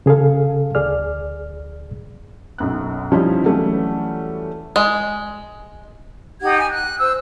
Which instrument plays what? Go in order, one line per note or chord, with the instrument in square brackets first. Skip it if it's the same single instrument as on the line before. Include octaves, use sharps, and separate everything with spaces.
[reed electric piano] C#3 G#4 A4 F5
D2 G#4 D5 F6
[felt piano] B1 F#2 F#6
F3 G3 C#4 D#4 E4
E3 F#3 G3 A3 C#4
[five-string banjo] G#3
[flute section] D#4 G4 F#5 G#6
G#5
F#6
C5 E6